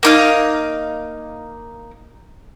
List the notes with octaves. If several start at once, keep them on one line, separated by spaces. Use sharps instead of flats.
A#3 D#4 F5